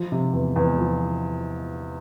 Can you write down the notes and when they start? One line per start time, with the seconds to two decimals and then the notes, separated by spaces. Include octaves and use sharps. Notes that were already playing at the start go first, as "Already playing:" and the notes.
Already playing: F3
0.12 C3
0.33 E2
0.56 E2
0.78 F3